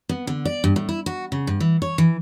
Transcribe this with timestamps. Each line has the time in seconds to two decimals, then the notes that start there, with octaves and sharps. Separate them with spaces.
0.09 B3
0.27 D3
0.45 D5
0.64 G2
0.76 A2
0.89 E4
1.06 F#4
1.32 C#3
1.47 G2
1.60 E3
1.82 C#5
1.98 E3